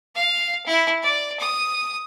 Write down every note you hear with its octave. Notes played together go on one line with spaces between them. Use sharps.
F5
E4
D5
D#6